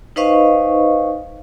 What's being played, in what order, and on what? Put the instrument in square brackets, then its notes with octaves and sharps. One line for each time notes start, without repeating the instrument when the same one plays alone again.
[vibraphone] D#4 B4 C5 D#5 F5 C#6